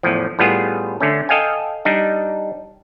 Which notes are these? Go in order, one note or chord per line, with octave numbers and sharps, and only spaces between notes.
E2 A2 F3
A2 G3 B3 F4 G#4
D3 A3 C#4
A4 D#5 F5 G5 G#5
G3 D4 D#4